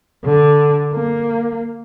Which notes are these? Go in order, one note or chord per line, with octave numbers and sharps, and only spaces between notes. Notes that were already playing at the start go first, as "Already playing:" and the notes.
D3
A#3